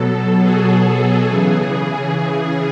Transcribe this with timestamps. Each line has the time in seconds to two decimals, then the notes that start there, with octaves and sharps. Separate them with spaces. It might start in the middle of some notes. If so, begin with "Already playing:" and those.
Already playing: B2 F#3 A4
0.41 G#4
1.26 C#3 E3